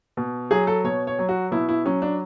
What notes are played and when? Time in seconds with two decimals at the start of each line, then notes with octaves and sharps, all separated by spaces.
0.17 B2
0.51 F#3 G#4
0.67 A4
0.84 B2 C#5
1.07 C#5
1.19 F#3
1.29 F#4
1.51 B2 E4
1.69 E4
1.85 F#3 C#4
2.02 D4